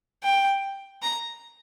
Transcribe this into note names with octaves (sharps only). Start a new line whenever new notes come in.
G5
A#5